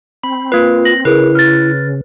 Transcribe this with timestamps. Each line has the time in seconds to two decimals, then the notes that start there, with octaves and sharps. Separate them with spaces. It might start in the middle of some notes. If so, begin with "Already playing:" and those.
0.24 C4 B5
0.52 A#3 F4 B4
0.85 A#6 F#7
1.05 C#3 E4 G#4 A#4 B4
1.35 F6 A6